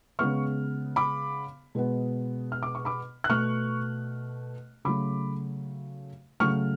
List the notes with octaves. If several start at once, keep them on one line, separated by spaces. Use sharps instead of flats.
C#3 G#3 B3 C#6 F6
B5 D6
B2 G#3 B3
F6
D6
C#6
B5 D6
F#6
B2 A3 C#6 F6
C#3 F#3 A3 B5 D6
C#3 F#3 A3 C#6 F6